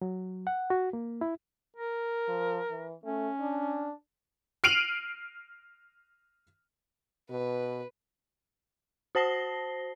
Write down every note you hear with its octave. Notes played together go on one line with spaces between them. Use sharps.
F#3
F#5
F#4
A#3
E4
A#4
F3
E3
A3 C#4
D4
F6 C7 D7 D#7 F7 F#7
B2 B4
F#4 C5 A5 A#6 C7 G7